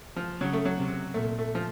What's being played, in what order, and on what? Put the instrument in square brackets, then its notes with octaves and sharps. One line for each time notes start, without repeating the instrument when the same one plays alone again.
[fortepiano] F3
[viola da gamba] C#3 [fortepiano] F#3
[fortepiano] A3
F#3
[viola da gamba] C3
[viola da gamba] A#2 [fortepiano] A3
[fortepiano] A3
F3